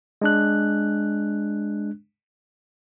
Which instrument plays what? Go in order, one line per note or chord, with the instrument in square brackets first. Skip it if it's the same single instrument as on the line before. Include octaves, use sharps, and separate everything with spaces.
[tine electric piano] G#3 D4 F#6